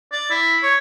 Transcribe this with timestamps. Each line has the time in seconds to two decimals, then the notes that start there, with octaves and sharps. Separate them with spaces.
0.12 D5
0.30 E4
0.63 C#5